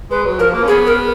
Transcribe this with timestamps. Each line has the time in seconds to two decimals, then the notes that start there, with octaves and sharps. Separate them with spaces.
0.11 G#3 B4
0.25 F#3
0.39 F3 A#4
0.53 A#3
0.64 C#4
0.68 B3 G#4
0.86 A#4